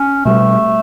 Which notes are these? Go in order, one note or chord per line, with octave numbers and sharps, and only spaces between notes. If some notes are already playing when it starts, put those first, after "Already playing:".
Already playing: C#4
B2 G3 A3 B3